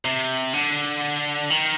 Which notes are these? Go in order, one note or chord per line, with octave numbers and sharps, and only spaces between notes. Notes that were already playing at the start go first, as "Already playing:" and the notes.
C3
D3
D#3